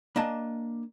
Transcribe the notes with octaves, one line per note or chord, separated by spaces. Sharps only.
A#3 D4 D#5 G#5 A5